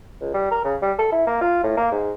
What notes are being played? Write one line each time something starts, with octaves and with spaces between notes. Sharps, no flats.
C#2
G3
A#4
C#3
G3
A4
E4
A#3
F4
A2
A#3
G#2